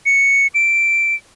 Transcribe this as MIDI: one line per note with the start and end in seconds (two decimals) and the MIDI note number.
0.06 0.47 97
0.55 1.15 98